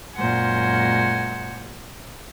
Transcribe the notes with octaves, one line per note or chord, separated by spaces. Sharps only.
F#2 A#2 G#3 C5 F#5 G#5